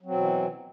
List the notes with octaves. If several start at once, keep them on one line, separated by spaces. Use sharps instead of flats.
B2 E3 F#3 C4